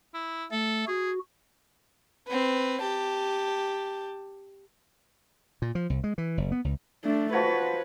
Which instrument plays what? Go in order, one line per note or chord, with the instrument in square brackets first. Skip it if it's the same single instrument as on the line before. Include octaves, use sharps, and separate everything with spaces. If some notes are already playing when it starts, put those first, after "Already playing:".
[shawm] E4
[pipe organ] A3 [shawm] A4
[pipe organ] F#4 [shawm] G#4
[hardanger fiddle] C4 B4
G4 A5
[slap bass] A#2
F3
C2
G#3
E3
F#1
B3
C#2
[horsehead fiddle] A3 D4
[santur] F3 F#4 C#5 [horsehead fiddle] B4